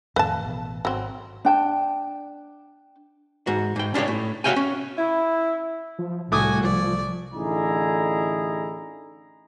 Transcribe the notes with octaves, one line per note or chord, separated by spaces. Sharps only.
F2 A2 D#3 B4 F5 A5
A1 B2
G#1 F#3 C4
D4 G5 A5
G#2 F#4
G#2 G5
C#4 D4 F4 G4 C#5
A2
F#4 C#5 E5 F5 G5 G#5
C#4
E4
F3
C2 A2 A3 F#4 G#5 D6 D#6
F3 D5
A1 D3 D#4 E4 G#4 A#5